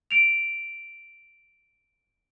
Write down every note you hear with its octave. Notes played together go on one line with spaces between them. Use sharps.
D7 F7